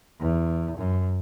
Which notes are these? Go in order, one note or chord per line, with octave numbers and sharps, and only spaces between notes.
E2
F#2